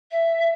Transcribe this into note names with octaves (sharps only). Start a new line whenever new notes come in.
E5